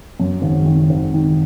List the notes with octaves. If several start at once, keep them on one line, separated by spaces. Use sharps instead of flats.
F#2
G#1
D#3
G#1
D#3